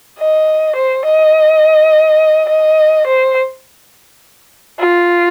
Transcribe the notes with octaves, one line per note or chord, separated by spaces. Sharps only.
D#5
C5
D#5
D#5
C5
F4